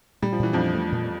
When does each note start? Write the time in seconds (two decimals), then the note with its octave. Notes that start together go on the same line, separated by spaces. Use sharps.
0.22 A#2 G3
0.33 F3
0.39 A#2 E3
0.53 F2 F3 D4
0.75 A3
0.92 A#2